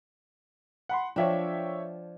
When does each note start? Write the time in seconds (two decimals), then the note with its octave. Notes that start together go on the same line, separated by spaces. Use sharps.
0.89 F#5 B5 C6
1.16 F3 D4 C#5 E5 G5